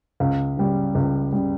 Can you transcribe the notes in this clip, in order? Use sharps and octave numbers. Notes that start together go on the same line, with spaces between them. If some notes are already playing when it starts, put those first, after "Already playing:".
C#2 F5
C#3 G3
C#2
C#3 G3